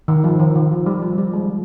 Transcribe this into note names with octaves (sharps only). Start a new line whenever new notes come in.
D#3
F3
D#3
D#3
F3
G3
F3
G3
G#3